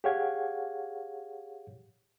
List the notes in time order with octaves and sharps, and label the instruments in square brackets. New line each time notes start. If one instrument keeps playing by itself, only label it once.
[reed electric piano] G4 G#4 C#5 F5 F#5 G#6